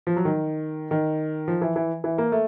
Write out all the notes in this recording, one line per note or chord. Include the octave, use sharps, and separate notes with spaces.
F3
F#3
D#3
D#3
F3
E3
E3
E3
A#3
A3